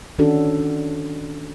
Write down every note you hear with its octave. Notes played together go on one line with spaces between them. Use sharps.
D#3 C#4 D4 F#4 A4